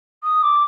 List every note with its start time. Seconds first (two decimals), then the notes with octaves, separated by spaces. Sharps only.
0.23 D#6
0.42 D6